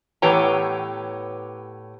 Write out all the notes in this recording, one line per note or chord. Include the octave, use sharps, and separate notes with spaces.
A2 E3 B3 G4 C#5 A#5